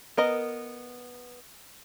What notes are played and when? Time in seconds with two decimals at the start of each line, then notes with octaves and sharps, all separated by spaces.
0.17 B3 A#4 D#5